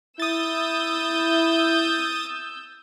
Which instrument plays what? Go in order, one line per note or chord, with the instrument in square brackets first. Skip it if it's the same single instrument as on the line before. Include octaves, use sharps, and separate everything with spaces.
[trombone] E4 [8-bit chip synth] D#6 A6 [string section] E6 G6